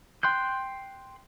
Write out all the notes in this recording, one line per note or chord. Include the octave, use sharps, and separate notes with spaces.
G5 C6 F#6 G6